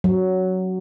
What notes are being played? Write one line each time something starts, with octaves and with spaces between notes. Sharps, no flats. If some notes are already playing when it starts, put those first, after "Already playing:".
F#3